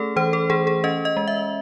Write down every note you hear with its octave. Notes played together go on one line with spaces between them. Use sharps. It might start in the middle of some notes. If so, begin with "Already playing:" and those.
Already playing: A3 C#4 G#4 A4
E3 C5
A4
E3 G#4
G#4
C#4 D#5
D#5
G#3
E5